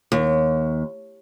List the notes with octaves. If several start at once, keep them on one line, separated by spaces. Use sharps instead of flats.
D#2